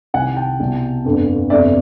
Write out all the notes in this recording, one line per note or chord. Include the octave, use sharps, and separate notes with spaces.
C2 C3 D#3 F#5 G#5
G5 A5
C2 B2
G1 F2 D3
G1 F2 C3 D5 E5